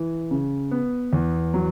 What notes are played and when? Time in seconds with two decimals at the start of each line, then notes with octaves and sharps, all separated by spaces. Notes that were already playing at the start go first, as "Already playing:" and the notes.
Already playing: E3
0.31 C#3
0.71 B3
1.13 E2
1.54 F#3